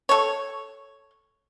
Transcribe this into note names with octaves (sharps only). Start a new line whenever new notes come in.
A4 C#5